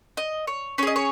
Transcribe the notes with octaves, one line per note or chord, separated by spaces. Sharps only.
D#5
C#5
C#4 G#4 C#5 D#5
C#5